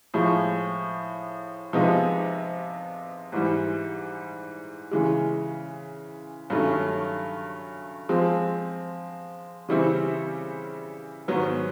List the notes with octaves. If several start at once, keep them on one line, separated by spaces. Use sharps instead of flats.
A2 F3 G#3
C3 F3 G#3 B3 D#4
G#2 E3 G3
C#3 E3 G#3
G2 D#3 F#3 A3 C#4
F3 G#3 C4
C#3 E3 G3 C4 E4
G#2 D#3 F#3 B3